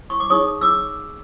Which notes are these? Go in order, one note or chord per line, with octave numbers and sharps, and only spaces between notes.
C#6
D6
D#4 G#4 C#5 C#6 D#6
D6 E6